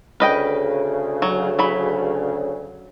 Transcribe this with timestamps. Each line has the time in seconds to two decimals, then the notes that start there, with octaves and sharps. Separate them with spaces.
0.20 D2 C#3 B4 D#5 G5
1.22 F#3
1.59 F#3 B5